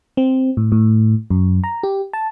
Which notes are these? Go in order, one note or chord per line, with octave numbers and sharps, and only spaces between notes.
C4
A2
A2
F#2
A#5
G4
A5